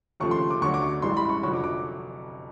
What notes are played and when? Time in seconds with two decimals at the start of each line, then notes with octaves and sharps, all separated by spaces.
0.20 D#2 C#3 F3 A3 C#6
0.31 C6
0.51 D6
0.61 D2 D3 F#3 C#6
0.74 D6
0.82 C#6
1.02 A1 G2 E3 G#3 C6
1.17 B5
1.29 C#6
1.43 F1 F2 D3 F#3 C#6
1.54 D6
1.64 D6